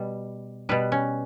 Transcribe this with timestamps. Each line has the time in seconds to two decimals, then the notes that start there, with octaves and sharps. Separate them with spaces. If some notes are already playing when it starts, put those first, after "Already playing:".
Already playing: B2 G3
0.69 B2 G3 B4
0.92 C#4